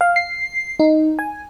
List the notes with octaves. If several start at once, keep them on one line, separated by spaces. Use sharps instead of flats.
F5
C7
D#4
G#5